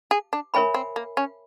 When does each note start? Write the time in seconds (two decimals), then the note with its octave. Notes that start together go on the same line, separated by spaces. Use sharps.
0.11 G#4
0.33 D4
0.54 C#4 A#4 C#5 E5 G#5 B5
0.74 C4
0.96 A#3
1.17 C#4